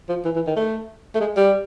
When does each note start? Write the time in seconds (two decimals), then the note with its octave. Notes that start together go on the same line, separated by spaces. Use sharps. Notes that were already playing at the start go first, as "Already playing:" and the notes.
0.09 F3
0.25 E3
0.36 E3
0.47 D#3
0.56 A3
1.15 A3
1.21 G#3
1.37 G3